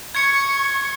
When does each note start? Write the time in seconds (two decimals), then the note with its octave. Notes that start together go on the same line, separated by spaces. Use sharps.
0.15 C#6 G#6 C#7